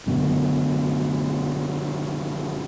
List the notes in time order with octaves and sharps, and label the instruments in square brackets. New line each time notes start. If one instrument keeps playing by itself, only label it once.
[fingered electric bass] F#2 B2 D3